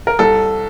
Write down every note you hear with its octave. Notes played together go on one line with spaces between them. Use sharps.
A#4
C2 A4